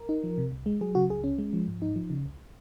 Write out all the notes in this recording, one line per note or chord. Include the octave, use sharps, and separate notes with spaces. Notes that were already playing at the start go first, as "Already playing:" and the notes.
Already playing: A#4
D#4
F3
C3
C2
G#3
F#3 G#4
C#3 F#4
C#2 G#4
C#4
G#3
F3
G#2
D#4
F3
C#3
C#2